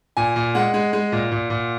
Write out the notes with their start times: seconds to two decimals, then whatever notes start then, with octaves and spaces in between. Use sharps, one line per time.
0.17 A#2 G#5
0.36 A#2
0.55 G#3 F#5
0.74 G#3
0.93 G#3
1.12 A#2
1.32 A#2
1.50 A#2